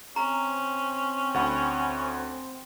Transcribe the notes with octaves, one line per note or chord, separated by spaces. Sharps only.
C4 C#4 A#5
D2 F#5 B5